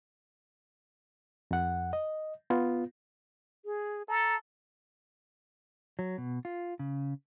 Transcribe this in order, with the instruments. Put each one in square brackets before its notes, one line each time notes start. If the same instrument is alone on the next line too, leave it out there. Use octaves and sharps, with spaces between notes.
[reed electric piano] F2 F#5
D#5
B3 F4
[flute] G#4
[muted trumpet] A4 [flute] A#5
[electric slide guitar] F#3
B2
F4
C#3